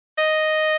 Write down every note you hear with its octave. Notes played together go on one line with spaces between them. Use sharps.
D#5